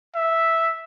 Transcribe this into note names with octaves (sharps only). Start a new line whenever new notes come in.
E5